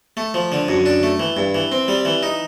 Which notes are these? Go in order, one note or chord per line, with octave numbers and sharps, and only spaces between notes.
A3
F3
D3
F#2
D4
A3
E3
G2
E3
C4
G3
E3
D#4